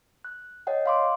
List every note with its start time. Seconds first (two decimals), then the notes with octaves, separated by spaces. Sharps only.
0.25 F#6
0.67 C#5 D#5 F#5 G5
0.86 F5 C6 D6